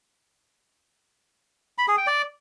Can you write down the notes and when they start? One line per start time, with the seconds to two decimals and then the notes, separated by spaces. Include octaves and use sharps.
1.78 B5
1.88 G#4
1.97 G5
2.07 D5